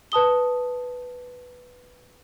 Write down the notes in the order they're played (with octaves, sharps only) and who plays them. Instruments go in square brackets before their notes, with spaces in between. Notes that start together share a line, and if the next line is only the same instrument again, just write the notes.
[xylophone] B4 A5 D#6 G7